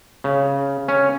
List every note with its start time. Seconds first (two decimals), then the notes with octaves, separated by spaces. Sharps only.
0.24 C#3
0.88 C#4